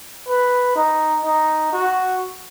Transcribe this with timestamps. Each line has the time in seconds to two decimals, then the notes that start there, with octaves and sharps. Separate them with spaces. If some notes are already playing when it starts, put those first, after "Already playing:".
0.28 B4
0.75 D#4
1.24 D#4
1.72 F#4